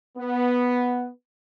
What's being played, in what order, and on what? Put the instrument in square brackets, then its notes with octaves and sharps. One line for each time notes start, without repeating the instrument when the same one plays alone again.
[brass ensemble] B3